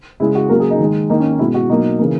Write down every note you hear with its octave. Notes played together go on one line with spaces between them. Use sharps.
C#3 G#3 E4
F#4
C#3 F#3 A#3 A#4
G#4
D#4
D#3 G#3
D#3 A#3 D#4
C#4
D#4
B2 G#3 E4
F#4
B2 F#3 A#3 D#4
C#3 E3 A#3